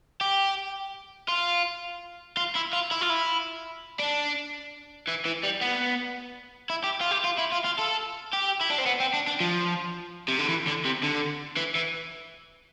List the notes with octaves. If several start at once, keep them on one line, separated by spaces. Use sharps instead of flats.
G4
F4
F4
E4
F4
E4
F4
E4
D4
E3
E3
G3
B3
E4
G4
F4
G4
F4
E4
F4
F4
A4
G4
E4
D4
C4
B3
C4
D4
D4
F3
C3
D3
E3
D3
C3
D3
E3
E3